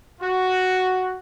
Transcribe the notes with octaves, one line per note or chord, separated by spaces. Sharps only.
F#4